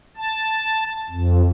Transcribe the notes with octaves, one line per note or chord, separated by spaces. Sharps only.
A5
F2